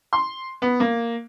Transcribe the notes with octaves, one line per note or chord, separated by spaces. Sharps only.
C6
B3
A#3